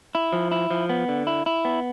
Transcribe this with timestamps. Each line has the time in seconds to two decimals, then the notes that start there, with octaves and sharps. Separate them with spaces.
0.15 E4
0.33 F3
0.51 E4
0.70 F3
0.89 B3
1.08 D3
1.27 E4
1.46 E4
1.65 B3